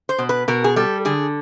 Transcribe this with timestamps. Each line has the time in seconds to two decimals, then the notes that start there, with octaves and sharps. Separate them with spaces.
0.09 C5
0.18 B2
0.29 B4
0.48 B2 A#4
0.64 G#4
0.76 G3 A4
1.05 D3 G#4